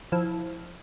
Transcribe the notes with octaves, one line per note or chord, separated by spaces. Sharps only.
F3 E4